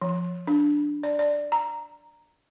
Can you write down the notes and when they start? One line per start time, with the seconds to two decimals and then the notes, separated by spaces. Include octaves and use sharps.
0.02 F3
0.47 D4
1.03 D5
1.19 D5
1.52 A#5